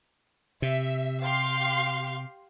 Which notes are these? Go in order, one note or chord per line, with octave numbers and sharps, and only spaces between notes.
C3 E5
G4 F5 C6